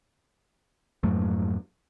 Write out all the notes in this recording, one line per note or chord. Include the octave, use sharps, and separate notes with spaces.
F2 G#2 F#3 A3